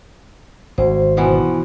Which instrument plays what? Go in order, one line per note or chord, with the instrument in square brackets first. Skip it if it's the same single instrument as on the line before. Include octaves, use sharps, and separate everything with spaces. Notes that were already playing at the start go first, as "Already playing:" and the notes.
[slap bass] G#1 [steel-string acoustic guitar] D2 [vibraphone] C5
[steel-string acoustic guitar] B2 E3 F3